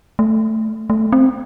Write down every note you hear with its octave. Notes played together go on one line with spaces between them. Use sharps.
A3
A3
C4